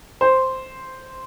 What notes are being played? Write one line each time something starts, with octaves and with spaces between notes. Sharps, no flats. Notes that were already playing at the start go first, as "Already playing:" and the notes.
C5